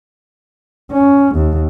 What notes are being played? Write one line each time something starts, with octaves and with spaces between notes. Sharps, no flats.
C#4
D#2